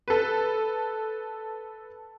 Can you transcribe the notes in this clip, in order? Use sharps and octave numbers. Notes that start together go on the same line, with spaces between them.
A4 B4